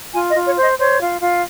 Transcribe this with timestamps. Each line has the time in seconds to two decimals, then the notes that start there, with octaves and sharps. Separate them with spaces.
0.13 F4 G#5
0.30 D#5
0.36 F4
0.46 C#5
0.57 C5
0.62 D#5
0.78 C5 C#5
1.00 F4
1.21 F4